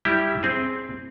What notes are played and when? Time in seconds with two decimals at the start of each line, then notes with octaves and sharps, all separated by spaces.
0.05 G3 E4 G4
0.43 C4 G#4